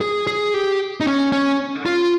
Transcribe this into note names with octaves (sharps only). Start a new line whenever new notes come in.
G#4
G#4
G4
D#4
C#4
C#4
F4